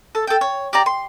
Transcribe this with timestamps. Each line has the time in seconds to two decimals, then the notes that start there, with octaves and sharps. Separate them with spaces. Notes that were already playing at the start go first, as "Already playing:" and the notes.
0.15 A4
0.27 A4 G5
0.41 C#5
0.73 G4 D5 A#5
0.86 C6